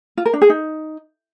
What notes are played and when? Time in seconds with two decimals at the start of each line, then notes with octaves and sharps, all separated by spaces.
0.17 F4
0.26 A#4
0.34 D4
0.42 G#4
0.50 D#4